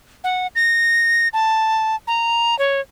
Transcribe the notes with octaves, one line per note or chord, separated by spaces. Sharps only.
F#5
A#6
A5
A#5
C#5